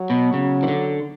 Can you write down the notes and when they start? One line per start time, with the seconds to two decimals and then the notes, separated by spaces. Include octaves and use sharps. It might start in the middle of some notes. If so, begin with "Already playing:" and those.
Already playing: F#3
0.10 B2
0.34 C#3
0.63 E3
0.68 D3